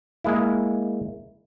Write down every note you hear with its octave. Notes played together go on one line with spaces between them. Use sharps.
G#3 A#3 E4